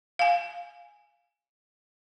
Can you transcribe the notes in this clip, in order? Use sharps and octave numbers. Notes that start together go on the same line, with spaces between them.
F5 G#5